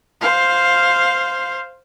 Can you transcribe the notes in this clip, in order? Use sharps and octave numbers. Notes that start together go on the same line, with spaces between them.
C5 F5